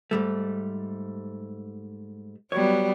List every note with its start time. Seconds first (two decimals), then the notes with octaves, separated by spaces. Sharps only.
0.11 G#2 G3 A3
2.52 F#3 G3 B3 C#5